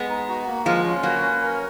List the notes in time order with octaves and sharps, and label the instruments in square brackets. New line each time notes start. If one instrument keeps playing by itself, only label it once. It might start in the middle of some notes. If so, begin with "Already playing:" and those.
Already playing: [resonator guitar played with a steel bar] G#3 B3
[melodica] D#4
F#4
A#3
[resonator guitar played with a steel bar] F3 G#3 [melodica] F4
[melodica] C#4
[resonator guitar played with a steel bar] F#3 A#3 [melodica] B4
[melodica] C#4
A#4